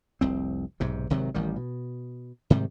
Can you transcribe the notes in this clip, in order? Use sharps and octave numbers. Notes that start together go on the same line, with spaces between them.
F1 C2 C4
B1 G#2 C3
G#1 C3 D#3 F#3
A1 D#3 G3
B2
G#2 C3 D#3 G3